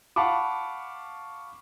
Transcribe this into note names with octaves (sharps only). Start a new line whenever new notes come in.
F5 F#5 A5 B5 C#6 D6